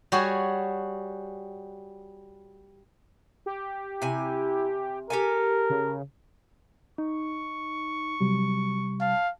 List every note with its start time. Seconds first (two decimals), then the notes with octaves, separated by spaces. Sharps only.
0.12 G3 F#4 G#4 C#5 G#5
3.46 G4
4.02 C3 E4 G#5
5.10 G4 A4 A#4 G#5
5.70 C#3
6.98 D#4 C#6
8.21 C3 F#3 G3
9.01 F5 A5